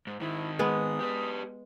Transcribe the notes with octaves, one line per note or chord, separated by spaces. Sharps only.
G#2
G#2 D#3 E4
G#3 B3 D#6
G4 B4